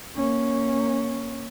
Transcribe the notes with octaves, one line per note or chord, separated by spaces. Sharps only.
A#3 C#4